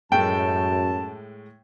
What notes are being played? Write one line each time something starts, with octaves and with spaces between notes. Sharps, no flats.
F#2 A2 G#3 A3 G5 A5